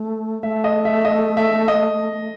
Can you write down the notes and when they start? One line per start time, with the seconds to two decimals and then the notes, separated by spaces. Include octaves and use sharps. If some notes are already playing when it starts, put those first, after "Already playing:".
Already playing: A3
0.43 A3 E5
0.64 D#5
0.85 E5
1.05 D#5
1.37 E5
1.68 D#5